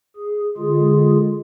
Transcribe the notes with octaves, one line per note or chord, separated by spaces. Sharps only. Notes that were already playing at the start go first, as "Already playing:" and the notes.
G#4
D3 G#3 F4 G#4